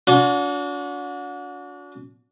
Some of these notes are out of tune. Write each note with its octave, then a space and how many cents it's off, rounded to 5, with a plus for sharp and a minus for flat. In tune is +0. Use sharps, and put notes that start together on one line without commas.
D4 -40 F#4 -35